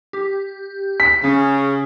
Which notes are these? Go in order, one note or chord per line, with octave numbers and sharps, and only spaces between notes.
G4
B6
C#3 C#4